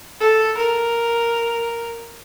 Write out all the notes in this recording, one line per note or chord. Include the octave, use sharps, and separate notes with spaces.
A4
A#4